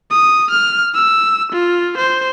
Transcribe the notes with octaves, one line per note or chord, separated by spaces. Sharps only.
D#6
F6
E6
F4
C5